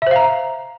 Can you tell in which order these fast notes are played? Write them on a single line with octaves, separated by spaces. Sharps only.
E5 C5 F5 A#5